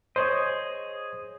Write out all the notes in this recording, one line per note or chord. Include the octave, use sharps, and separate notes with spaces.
G#4 C5 C#5 D#5